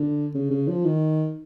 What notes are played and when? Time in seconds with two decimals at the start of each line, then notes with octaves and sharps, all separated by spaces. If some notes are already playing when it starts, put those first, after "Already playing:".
Already playing: D3
0.35 C#3
0.51 C#3
0.68 F3
0.85 D#3